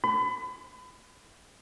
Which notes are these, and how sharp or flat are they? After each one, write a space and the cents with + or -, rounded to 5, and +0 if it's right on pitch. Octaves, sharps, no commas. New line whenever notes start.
B5 +35